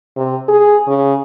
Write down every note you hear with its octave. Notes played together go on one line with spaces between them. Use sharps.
C3
G#4
C#3